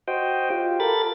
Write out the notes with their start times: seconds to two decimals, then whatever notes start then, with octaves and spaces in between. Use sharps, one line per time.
0.08 F#4 C5 D#5 G5
0.50 F4 G4
0.80 A4 A#4 B5 A6